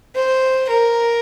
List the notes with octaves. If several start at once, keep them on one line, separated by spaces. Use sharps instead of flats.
C5
A#4